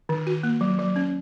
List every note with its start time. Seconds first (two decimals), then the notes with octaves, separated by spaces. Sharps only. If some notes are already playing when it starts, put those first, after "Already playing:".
0.09 D#3
0.27 F#4
0.43 A#3
0.61 F#3
0.79 F#3
0.96 C#4